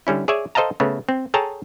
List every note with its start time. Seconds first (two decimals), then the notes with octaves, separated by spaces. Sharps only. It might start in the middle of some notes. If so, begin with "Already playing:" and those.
0.07 D3 G3 C#4 E4
0.28 G#4 C#5 D5 E5 G#5
0.55 A4 C5 D#5 F5 A5 A#5
0.80 C#3 A3 B3
1.09 C4
1.34 G#4 A4 C#5 G5 A5 A#5